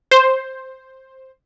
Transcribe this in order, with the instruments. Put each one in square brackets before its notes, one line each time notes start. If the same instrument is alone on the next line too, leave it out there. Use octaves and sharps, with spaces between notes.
[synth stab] C5